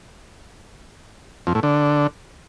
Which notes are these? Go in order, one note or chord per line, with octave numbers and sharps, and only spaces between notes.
F2
A2
D3